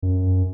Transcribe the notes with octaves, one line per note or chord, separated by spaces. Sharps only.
F#2